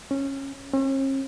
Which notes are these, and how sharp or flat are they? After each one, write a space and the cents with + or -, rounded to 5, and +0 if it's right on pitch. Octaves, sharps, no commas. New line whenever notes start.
C#4 -15
C#4 -45